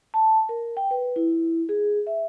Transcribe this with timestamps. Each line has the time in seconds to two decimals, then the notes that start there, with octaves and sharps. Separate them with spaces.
0.14 A5
0.49 A#4
0.77 G5
0.91 B4
1.16 E4
1.69 G#4
2.07 E5